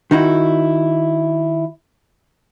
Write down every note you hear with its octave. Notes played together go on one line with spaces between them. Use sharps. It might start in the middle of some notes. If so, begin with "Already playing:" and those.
D#3 D#4 E4 F#4